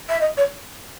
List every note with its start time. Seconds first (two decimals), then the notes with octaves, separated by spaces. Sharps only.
0.10 E5
0.21 D#5
0.37 C#5